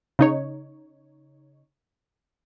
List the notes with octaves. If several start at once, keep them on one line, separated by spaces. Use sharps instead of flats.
C#3 D#4 C#5